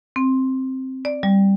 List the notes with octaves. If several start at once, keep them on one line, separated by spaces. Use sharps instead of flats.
C4
D5
G3